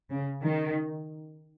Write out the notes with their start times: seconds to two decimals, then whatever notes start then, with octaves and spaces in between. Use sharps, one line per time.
0.10 C#3
0.42 D#3